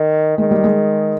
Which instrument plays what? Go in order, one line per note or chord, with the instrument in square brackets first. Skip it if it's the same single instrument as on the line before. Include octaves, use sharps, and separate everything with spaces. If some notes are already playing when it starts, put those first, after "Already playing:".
Already playing: [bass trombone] D#3
[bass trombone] D#3 [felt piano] G#3
[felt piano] G3
G#3